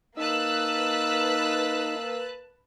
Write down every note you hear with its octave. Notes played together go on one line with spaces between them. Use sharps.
A#3 D#4 B4 D#5 A5 E6 F#6